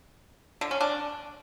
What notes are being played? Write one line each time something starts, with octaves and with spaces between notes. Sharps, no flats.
D3
C#4
D4